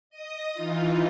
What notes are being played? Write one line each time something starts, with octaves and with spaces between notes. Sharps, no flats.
D#5 D#6
E3 D#4 F4